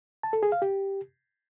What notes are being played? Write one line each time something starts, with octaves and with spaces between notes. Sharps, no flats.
A5
A4
G#4
F5
G4